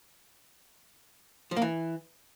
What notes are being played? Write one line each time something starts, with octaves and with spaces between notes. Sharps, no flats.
F3
A#3
E3